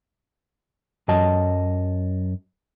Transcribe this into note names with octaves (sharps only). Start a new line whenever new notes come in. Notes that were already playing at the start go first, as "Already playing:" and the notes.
F#2 F#3 D#5 A5